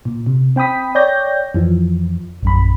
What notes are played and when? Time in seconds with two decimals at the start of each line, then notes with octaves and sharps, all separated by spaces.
0.05 A#2
0.26 C3
0.56 C4 G5 B5 D#6 B6
0.95 C#5 D5 G5 G6 A#6
1.54 F2 E3 F3
2.43 A#1 F#2 B5